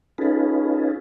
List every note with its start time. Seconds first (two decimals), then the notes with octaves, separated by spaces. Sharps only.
0.18 C#4 D#4 F4 G#4 A4 B4